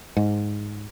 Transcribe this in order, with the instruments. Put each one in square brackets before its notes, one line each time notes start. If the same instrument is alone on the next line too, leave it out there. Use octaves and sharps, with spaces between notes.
[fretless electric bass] G#2